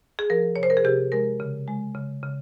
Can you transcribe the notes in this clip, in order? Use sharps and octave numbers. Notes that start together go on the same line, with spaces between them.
G#4
F3 A#4
C3 C#5
C5
A#4
G#4
C3 G4
G#3 A#4
C#3
G#3
C#3
C#3